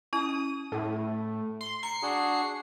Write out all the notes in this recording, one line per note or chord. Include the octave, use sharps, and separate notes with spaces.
C#4 E4 D#6
A2
C6
A#5 C7 C#7
D4 F#4 G#4